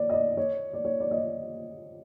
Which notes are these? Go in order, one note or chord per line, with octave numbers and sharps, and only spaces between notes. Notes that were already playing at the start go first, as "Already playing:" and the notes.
Already playing: C#5 D5
D#5
D5
C#5
D5
C#5
D5
D#5
D5